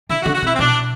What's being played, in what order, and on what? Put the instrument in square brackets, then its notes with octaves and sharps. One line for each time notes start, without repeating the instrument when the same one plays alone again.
[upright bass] D3 [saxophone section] E4
[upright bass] D3 [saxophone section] F#4
[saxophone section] F#4
[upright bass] C3
[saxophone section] E4
C4
[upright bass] B2 [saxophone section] D4